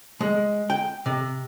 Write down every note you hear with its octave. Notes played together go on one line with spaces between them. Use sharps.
G#3
G5
C3